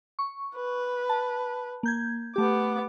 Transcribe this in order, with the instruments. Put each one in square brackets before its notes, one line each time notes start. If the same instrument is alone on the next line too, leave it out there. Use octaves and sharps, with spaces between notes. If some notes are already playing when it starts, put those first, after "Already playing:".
[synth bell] C#6
[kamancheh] B4
[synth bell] A5
A#3 G6 G#6
[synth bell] A3 G4 [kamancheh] B3 D6